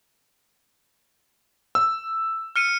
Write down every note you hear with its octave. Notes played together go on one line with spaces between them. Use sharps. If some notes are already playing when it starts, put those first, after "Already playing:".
E6
F6 C#7 D#7